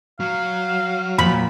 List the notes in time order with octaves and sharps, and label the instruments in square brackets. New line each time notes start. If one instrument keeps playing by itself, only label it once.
[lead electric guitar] F#3 [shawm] F5
[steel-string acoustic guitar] A#2 F3 [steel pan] B5